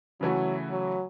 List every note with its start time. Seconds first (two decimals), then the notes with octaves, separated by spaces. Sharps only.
0.21 C#3 E3 F#3 A3 F#4
0.70 F#3